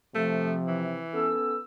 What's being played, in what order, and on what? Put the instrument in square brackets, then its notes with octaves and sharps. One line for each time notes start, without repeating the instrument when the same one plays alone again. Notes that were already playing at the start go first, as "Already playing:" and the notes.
[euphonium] C3 [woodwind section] F3 [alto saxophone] A3
[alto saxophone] E3
[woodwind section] B3 C#4 [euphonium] A4 [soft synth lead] E6